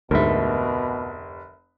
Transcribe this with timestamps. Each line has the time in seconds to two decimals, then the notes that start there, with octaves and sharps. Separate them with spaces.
0.11 F1 D2 G#2 B2 A#4 E5